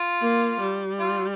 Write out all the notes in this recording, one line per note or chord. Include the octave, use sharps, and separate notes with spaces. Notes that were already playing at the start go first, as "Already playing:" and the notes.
Already playing: F4
A#3
G3
F4